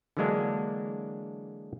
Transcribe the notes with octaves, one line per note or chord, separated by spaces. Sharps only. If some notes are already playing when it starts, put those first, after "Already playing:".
D3 E3 F#3 G#3 A#3 D4